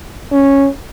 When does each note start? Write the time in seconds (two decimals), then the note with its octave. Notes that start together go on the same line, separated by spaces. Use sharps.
0.32 C#4